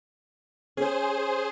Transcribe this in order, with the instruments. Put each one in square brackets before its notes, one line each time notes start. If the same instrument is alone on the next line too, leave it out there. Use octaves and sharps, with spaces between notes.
[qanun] C#4 [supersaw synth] G#4 C5